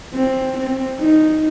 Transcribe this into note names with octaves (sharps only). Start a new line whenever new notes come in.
C4
C4
D#4